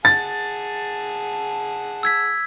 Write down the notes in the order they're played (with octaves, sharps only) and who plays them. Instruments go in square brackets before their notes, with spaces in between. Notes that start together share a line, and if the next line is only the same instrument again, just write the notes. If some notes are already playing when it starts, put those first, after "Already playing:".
[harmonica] G#4 F#5 A5 [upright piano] A6
[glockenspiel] E6 G#6 B6